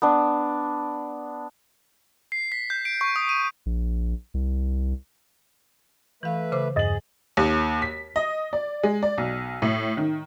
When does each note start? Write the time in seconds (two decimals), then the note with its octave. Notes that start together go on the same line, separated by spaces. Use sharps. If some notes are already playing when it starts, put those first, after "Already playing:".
0.02 B3 D4
2.32 C7
2.52 B6
2.70 G6
2.85 D7
3.01 C#6
3.16 D#6
3.29 D#7
3.66 A#1
4.34 C2
6.23 E3 A3 B4 E5 F5
6.52 C#3 C5 D6
6.76 E2 G2 G#4 D#5 A6 F#7
7.37 D#2
7.82 B6
8.16 D#5
8.53 D5
8.83 G#3
9.03 D5
9.18 B1
9.62 A2
9.97 D#3